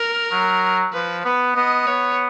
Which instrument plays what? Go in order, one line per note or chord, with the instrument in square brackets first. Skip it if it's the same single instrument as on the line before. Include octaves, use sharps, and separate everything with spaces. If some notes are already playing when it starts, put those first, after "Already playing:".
Already playing: [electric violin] A#4
[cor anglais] F#3
[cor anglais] F3 [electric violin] B4
[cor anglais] B3 [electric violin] B4
[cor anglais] B3 [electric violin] D#5
[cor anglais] B3 [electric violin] C#5